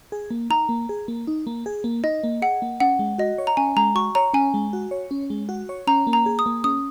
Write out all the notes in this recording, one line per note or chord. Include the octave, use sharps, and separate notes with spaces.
G#4
A#3
D#4 A#5
A#3
G#4
A#3
D#4
A#3
G#4
A#3
D#4 D#5
A#3
G#4 F#5
A#3
C#4 F#5
G#3
F#4 D#5
C#5
A#5
C#4 G#5
G#3 A#5
F#4 C#6
C#5 A#5
C#4 G#5
G#3
F#4
C#5
C#4
G#3
F#4
C#5
C#4 A#5
A#3
A#5
G#4
D#6
A#3
C#4 D#6